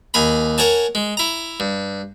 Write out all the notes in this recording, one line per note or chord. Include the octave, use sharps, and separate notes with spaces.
D#2 G#5 A#5 B5
A#4 C#5 F#5 G#5 A5
G#3
E4 A#5
G2